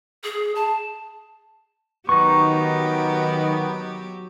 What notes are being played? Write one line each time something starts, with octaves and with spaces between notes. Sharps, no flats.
G#4
A5
D#3 F#3 B3 D#4 G4 C#6